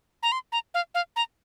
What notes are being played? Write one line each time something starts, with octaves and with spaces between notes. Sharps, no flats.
A#5
C6
A#5
F5
F5
A#5